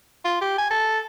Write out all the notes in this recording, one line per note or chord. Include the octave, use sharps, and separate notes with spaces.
F4
G4
G#5
A4